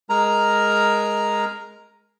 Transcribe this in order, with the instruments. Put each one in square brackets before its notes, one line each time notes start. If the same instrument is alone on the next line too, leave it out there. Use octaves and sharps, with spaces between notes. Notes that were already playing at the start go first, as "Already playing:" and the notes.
[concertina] G#3 A#4 A#5